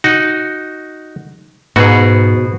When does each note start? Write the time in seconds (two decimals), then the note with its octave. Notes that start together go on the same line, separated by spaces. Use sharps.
0.04 D#4 F#4
1.76 G#2 B2 F#4 G#4